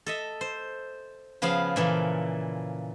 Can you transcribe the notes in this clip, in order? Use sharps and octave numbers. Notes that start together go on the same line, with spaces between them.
A4 D#5 E5
C5
C#3 F3 B3 G#4 F5
A#2 C#3 E3 A#3 A4